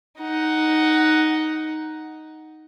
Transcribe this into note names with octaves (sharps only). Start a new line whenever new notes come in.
D#4 F#5